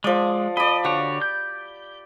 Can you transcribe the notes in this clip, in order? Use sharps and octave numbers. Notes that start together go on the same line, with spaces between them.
F3 G#3 D5
D5 D#5 B5
D3 F#4 G4 C#5
G6